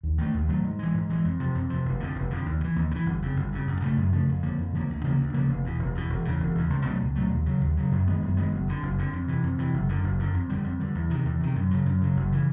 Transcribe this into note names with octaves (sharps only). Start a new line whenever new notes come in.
D#2
D#3 F#3 A3
D#2
D#3 F#3 A3
G#2
E3 G#3
G#2
E3 G#3
F2
C3 F3
F2
C3 F3
F1
F2 D3
F1
F2 D3
D#2
C#3
E3
D#2
C#3
E3
G1
F2 C#3
G1
F2 C#3
F#2
C#3 F3 A3
F#2
C#3 F3 A3
F2
D3 F3 A#3
F2
D3 F3 A#3
D2
C#3 F3 A#3
D2
C#3 F3 A#3
F1
E2 B2
F1
E2 B2
E1
E2 C#3
E1
E2 C#3
C#2
B2 F#3 A3
C#2
B2 F#3 A3
D#2
C#3 F#3
D#2
C#3 F#3
F#2
D#3 G#3 B3
F#2
D#3 G#3 B3
F#1
F2 D3
F#1
F2 D3
F2
C3 E3
F2
C3 E3
F#1
F#2 D3
F#1
F#2 D3
F2
D3 G3
F2
D3 G3
E2
C3 D#3
E2
C3 D#3
F#2
C#3 F#3
F#2
C#3 F#3
F#1
C#3 E3